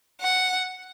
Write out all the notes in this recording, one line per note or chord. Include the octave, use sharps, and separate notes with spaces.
F#5